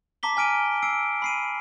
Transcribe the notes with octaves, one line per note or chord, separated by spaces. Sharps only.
A5 A#5 D6 B6 G7
G#5 F6 D7 D#7
E6 C7 D7
B5 C7 D#7